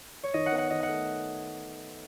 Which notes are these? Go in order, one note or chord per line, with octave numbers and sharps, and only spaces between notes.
C#5
D#3 D#5
F#5
B3
F#5
D#3 D#5
F#5
A3